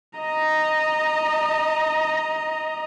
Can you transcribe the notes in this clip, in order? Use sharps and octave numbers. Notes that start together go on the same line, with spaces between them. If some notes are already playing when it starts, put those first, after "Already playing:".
D#5 A#5